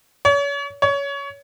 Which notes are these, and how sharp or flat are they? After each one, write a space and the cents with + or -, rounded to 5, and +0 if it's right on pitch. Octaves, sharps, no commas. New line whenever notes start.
C#5 +35
C#5 +20